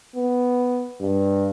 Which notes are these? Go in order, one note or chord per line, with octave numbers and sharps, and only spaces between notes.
B3
G2